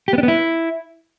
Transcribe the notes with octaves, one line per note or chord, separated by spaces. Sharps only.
G4
B3
D4
B3
E4